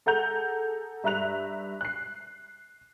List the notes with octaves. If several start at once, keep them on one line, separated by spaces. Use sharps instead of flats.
G#4 A4 F#5 A#5 G6 F7
G2 E5 A#5 F#6 F7
F#6 C7